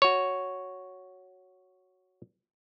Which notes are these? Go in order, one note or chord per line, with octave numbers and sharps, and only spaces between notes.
F#4 C#5